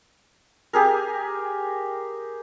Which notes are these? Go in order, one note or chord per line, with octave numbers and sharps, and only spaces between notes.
G4 G#4 A#4